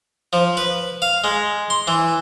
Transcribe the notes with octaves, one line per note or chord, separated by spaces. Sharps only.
F3
B4
F5
G#3
C6
E3